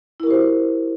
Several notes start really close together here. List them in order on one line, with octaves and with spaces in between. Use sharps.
E4 A#4 G4 C5 F#4